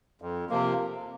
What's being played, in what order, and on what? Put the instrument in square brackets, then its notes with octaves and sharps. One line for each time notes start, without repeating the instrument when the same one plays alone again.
[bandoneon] F2
C3 F3 A#3